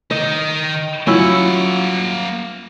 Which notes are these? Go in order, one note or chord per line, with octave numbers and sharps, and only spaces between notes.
D#3 D#4 D#5
F#3 A#3 C#4 E4 F4 F#5